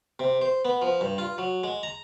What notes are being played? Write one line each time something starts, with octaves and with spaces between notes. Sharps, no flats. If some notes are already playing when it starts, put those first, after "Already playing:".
C3
C5
B3
F3
G2
F4
F#3
G#3
A#5